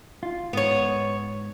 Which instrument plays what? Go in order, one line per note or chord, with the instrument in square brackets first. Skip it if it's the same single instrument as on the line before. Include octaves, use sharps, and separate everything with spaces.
[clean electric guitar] F4
[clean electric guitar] G#2 [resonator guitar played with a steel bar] B3 C#5